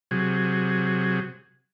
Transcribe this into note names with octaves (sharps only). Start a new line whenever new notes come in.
C3 F#3 G#4